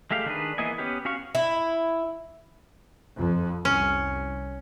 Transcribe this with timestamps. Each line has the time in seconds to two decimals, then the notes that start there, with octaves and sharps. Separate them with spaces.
0.11 G#3 A3 G4 F5
0.26 D#3 D4 G#4 B4
0.58 E3 A#3 B3 D#5 G#5
0.78 B3 C#4 G4 B4
1.05 C#4 F#4 F5 F#5 C#6
1.35 E4
3.16 F2
3.65 C2 C#4